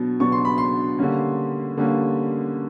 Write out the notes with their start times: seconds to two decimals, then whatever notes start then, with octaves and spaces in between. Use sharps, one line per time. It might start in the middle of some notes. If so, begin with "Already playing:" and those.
Already playing: B2 F#3 B3 D4
0.20 B2 F#3 B3 D4 C#6
0.32 C6
0.45 B5
0.58 C6
0.99 D3 G3 A#3 C#4
1.77 D3 G3 A#3 C#4